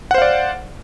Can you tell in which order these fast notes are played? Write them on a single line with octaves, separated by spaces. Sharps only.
F#5 C5 F5 D5